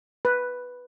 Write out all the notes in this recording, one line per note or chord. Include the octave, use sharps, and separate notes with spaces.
B4